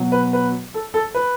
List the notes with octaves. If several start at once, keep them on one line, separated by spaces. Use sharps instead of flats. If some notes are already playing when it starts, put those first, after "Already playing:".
Already playing: B2 F#3
B4
B4
A4
A4
B4